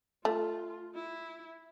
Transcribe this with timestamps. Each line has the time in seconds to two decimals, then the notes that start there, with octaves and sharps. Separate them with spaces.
0.25 A3 F4
0.95 E4